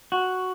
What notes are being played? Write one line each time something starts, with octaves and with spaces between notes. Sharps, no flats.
F#4